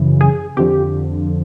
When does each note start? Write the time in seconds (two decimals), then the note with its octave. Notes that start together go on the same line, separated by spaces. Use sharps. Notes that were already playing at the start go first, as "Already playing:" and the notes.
Already playing: F#2 C#3 E3
0.21 G#4
0.57 F2 D3 F3 G4